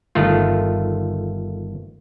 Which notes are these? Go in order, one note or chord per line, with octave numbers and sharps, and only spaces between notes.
G1 D#3 A3 F4